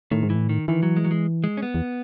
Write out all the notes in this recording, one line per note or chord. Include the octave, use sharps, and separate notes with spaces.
A2 D#3
G#2
E3
A2
D#3
D#3 E3
F#3
G#3
F#3
G#3
G#3
C#4
B3
E2